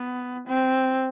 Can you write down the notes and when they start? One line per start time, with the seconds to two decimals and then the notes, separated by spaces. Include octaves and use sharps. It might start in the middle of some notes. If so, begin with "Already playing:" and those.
Already playing: B3
0.48 C4